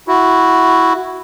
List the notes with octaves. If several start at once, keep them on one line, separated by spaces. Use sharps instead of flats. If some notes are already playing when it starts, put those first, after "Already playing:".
E4 F#4